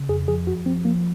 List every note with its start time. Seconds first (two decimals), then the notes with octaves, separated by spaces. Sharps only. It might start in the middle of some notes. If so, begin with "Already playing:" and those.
Already playing: C#3
0.09 F2 G#4
0.28 F3 G#4
0.47 F#2 F#4
0.66 F3 C4
0.85 F3 A#3